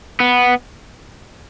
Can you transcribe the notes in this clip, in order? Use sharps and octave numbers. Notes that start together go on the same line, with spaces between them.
B3